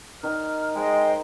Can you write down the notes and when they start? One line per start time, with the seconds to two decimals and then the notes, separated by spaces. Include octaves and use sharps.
0.23 D#3 F6
0.75 G#3 C5 D#5 G5